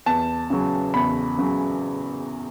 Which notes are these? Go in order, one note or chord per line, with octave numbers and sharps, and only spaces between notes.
E2 A5
C#3 F#3
E2 B5
C#3 F#3